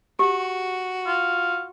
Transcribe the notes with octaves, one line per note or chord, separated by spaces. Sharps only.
F#4 G4
F4